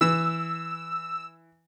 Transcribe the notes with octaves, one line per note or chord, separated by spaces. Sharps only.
E3 E6